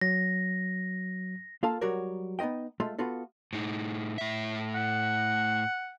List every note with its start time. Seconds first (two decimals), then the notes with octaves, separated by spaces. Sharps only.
0.01 F#3 A#6
1.63 A#3 F4 A4 F5 A5
1.81 F#3 G3 F#4 A#4 C#5
2.39 B3 D#4 F4 D#5 G5
2.80 G#3 A3 F4 A4
2.98 B3 F4 F#4 A4
3.53 A2 D#4
4.18 A2 E5
4.74 F#5